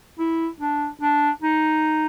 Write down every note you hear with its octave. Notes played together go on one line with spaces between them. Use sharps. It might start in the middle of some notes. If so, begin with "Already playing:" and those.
E4
D4
D4
D#4